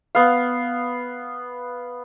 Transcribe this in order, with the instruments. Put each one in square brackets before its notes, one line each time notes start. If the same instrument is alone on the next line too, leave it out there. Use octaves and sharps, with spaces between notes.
[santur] B3 F5